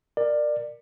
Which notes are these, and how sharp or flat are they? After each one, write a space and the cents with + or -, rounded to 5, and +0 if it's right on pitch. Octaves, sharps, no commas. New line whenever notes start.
A#4 +5 D5 +20